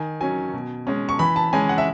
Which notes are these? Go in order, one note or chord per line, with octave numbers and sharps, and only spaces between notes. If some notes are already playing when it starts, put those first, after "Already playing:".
Already playing: D#3 G#5
F#3 C#4 G#5
B2
G#3 C#4
C#6
E3 B5
A5
G#3 C#4 G#5
F#5
E5